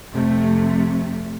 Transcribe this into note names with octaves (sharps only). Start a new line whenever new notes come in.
F2 C3 A3